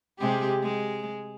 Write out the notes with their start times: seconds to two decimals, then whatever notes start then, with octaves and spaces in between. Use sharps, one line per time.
0.19 C3 G#3 G4
0.63 G#3